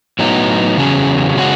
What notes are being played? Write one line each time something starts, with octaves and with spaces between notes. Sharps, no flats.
A2 F#3 B3 D#4
E2 C#3 F#3 C#4 G#4
C#3 G#3 C#4 F#4